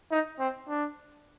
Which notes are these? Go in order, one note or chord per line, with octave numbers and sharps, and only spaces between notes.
D#4
C4
D4